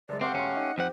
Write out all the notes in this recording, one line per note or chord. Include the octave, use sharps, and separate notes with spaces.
F#1 G#3 D5
A3 C4 G4 C5 F5 F#5 D6
E1 C#4 C6
D#4
F2 G4 C5 F#5